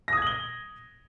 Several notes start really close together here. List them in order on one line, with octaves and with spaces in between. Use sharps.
A#6 D#6 G#6 F#7 G7